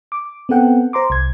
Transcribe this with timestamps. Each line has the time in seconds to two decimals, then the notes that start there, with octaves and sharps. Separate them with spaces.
0.12 D6
0.49 B3 C4 A4 F#5 G5
0.93 C5 A#5 C6 D6
1.10 C2 G#6